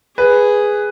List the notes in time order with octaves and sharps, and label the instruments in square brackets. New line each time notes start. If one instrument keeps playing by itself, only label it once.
[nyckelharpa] G#4 [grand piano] B4